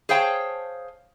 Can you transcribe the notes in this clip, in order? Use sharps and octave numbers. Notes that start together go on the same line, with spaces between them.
G#4 C5 C#5 F5 G5 A5